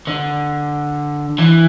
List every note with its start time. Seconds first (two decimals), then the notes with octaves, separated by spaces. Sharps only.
0.07 D3
1.39 E3